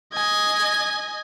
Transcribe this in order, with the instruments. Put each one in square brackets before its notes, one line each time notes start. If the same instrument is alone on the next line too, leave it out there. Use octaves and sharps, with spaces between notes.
[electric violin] D#5 G#5